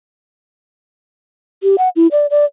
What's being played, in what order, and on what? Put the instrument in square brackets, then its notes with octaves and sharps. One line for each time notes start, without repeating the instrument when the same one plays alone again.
[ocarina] G4
F#5
E4
D5
D5